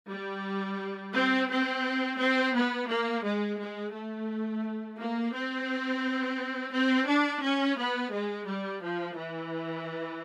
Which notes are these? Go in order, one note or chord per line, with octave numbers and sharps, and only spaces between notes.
G3
C4
C4
C4
B3
A#3
G#3
G#3
A3
A#3
C4
C4
D4
C#4
B3
G#3
G3
F3
E3